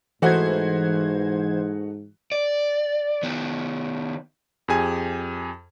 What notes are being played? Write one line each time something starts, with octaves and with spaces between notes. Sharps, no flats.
G#2 E3 A3 D#4 F#4 C5 G#6
D5
D#3 B3
F2 G4 G#4 G#5